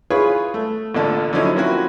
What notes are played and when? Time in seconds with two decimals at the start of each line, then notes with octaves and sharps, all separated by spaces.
0.10 E4 F4 G#4 B4 C#5 C#6
0.54 A3
0.95 A1 A#2 D3 A5
1.33 D3 F3 F#3 C#4 D#4 E4
1.56 F3 A#3 C4 C#4 E4 F#4